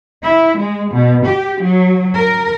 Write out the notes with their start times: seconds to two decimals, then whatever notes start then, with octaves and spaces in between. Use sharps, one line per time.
0.23 E4
0.57 G#3
0.93 B2
1.25 G4
1.60 F#3
2.17 A#4